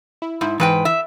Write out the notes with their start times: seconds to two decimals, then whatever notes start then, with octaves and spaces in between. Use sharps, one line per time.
0.22 E4
0.41 G#2 E4
0.60 G#2 E3 B4 G5
0.85 E5